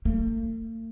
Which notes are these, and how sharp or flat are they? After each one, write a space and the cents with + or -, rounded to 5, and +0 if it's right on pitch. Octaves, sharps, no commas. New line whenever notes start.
A3 +45